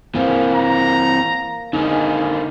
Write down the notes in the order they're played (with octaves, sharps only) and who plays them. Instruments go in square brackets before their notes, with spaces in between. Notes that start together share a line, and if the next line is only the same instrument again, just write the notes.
[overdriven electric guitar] E3 C4 [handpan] A#3 [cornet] G#4
[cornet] A#5
[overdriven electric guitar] D3 A#3 [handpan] D#4 [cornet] G#4